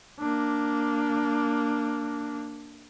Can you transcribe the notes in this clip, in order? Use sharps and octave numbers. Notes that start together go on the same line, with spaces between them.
A#3 D4